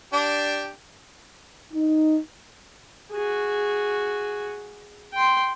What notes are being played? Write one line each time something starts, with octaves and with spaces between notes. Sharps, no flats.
D4 G4
D#4
F#4 G#4
G5 C6